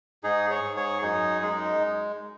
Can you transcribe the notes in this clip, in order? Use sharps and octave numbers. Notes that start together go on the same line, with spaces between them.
G#2 D#4 G#4
G#4 C#5
G#2
G#4 C#5
F#2 D#4 G#4
G#3 D#4